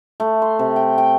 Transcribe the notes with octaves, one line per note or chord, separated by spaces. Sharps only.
A3
C6
C3
G5
G5